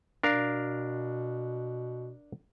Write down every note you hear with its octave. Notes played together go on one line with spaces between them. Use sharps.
B2 D4 A#4 F5